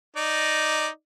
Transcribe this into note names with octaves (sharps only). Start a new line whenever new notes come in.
D#4 D5